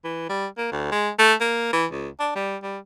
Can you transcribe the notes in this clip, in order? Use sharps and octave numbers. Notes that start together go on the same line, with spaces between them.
E3
G3
A#3
D2
G#3
A3
A#3
E3
C#2
D4
G3
G3